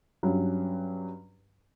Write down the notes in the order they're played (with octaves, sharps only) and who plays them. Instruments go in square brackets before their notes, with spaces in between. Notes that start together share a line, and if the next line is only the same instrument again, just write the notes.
[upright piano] G2 F#3 C#4